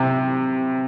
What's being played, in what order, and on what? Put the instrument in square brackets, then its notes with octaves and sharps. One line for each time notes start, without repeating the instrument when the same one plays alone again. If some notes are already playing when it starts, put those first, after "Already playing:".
Already playing: [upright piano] C3